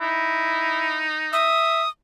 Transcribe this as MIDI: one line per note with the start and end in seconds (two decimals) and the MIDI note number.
0.01 1.51 63
0.01 1.06 64
1.33 1.83 76
1.33 1.89 87